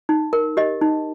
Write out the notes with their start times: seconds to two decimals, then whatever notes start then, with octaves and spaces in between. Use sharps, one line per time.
0.09 D#4
0.33 A#4
0.57 G4 D#5
0.81 D#4